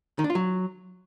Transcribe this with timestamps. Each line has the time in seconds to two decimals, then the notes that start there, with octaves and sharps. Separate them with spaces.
0.19 D#3
0.24 D4
0.30 F4
0.35 F#3